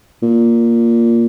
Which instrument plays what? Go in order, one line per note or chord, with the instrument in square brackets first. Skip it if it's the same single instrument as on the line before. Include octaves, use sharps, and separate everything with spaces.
[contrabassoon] A#2